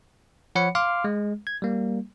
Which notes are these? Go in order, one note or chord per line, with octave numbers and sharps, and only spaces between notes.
F3 C#5 F#5 B5 C#7
F5 C6 D6 F6
G#3
G#6
G3 A#3